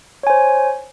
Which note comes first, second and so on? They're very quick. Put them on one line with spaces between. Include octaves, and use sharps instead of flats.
C#5 G#5 C5